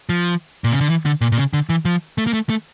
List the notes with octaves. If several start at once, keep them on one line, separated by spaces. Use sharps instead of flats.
F3
A#2
C#3
D3
E3
D3
A#2
A#2
C#3
D3
E3
F3
A3
A#3
A3
A3